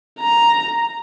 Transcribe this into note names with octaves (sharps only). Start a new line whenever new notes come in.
A#5